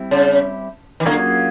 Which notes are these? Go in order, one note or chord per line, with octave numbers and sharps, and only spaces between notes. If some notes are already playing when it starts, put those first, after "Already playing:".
Already playing: G3 C4 E4 G4
C#3
D#3
D3 F#3 A#3 C#4 F4 G#4